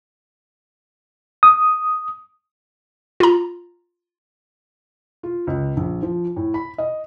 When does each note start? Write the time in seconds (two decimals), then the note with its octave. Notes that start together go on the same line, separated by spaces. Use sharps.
1.43 D#6
3.20 F4 A#5
5.23 F4
5.47 C#2
5.77 A#1
6.02 F3
6.36 A2
6.54 B5
6.78 D#5